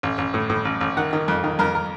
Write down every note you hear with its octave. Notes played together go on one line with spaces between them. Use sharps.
A1
A1
A2
A2
A1
A1
D#3 F#5
D#3
F2
D#3
F2 A#4
A#4